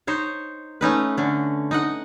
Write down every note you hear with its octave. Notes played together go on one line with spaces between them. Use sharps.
D#4 C5 C#5
A3 C#4 D#4 B4
D3 C#4
D#4 D#5 F#5